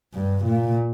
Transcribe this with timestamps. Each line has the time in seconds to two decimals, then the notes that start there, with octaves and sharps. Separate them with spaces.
0.14 G2
0.45 A#2